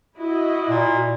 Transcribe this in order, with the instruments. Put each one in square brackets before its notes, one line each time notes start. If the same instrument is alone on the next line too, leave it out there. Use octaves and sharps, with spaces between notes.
[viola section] E4 F#4 D#5
[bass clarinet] A#2